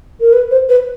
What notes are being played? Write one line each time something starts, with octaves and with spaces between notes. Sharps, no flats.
A#4
B4
C5
B4